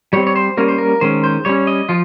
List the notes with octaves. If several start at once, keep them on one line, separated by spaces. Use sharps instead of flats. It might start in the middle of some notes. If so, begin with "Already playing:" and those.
G3 C4 C#5
C#5
C5
G3 A#3 C#4 A#4
C5
A#4
D#3 G#3 C#4 C5
C5
G3 C#4 C#5
D#5
F3 F4